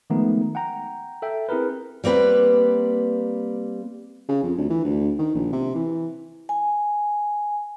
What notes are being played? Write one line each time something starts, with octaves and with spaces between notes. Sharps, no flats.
D#3 F3 G#3 A3 B3 D#4
F#5 G5 A#5
A4 E5 G5
C4 E4 G#4 A#4 B4
G3 A#3 C4 B4
C#3
F2
D2
E3
D2
D#3
A#1
C3
E3
G#5